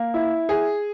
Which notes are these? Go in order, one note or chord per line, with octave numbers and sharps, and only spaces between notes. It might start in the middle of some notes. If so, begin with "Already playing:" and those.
Already playing: A#3
E4
G#4